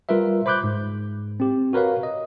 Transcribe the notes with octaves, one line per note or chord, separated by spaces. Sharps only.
G3 F4 A#4 B4 E5
C5 B5 D6 F#6 G6
G#2
C4 G4
F#4 A#4 B4 C#5 F5
D#5